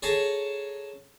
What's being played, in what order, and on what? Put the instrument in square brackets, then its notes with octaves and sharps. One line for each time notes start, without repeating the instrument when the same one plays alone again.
[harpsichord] G#4 A4 C#5 A5 A#5